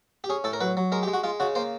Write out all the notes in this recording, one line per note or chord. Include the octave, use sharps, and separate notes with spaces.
G4
C#4 G#4
A2 A4
A#4
F#3 B4
F#3
G#3 A#4
G4
G#3
F#4
G#3 F4
C#3 F#4
A#3 C5